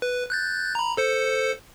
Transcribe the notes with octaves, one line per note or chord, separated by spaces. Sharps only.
B4
F#6 G6 A6
A#5 B5
A4 C5 C#7